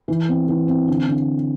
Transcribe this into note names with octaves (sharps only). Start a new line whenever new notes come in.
E3
C4
E3
C4
D3
D3